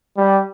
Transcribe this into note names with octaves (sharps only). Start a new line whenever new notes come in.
G3